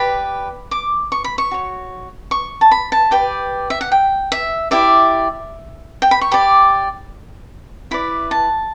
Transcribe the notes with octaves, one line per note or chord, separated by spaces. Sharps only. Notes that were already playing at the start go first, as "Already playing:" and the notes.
Already playing: G4 B4 D5 B5
D6
C#6
B5
C#6
F#4 C#5
C#6
A5
B5
A5
G4 B4 D5 G5
E5
F#5
G5
E5
E4 G4 D5 E5
G5
B5
C#6
G4 D5 B5
E4 B4 D5 B5
A5